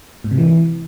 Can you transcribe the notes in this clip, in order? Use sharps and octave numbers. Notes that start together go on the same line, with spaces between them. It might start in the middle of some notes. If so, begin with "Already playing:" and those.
G#2
C3
E3